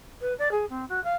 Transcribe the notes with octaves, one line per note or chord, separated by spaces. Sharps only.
B4
D5
G#4
C4
F#4
F5